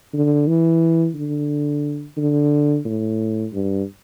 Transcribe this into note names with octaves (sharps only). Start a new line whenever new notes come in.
D3
E3
D3
D3
A2
G2